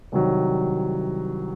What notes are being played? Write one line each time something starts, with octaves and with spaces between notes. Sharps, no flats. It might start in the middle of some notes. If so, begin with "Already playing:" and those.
C2 C3 D#3 F#3